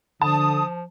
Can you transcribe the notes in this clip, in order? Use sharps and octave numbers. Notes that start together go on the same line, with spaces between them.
D3 F3 A5 D#6